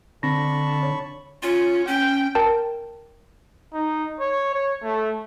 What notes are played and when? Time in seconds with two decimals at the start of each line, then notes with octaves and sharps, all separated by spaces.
0.23 D3 C4 A5 B5 C#6 A#6
0.83 C#5
1.43 C#4 F4
1.88 C#4 G5
2.35 A#4 G5 A5
3.74 D#4
4.20 C#5
4.54 C#5
4.83 A3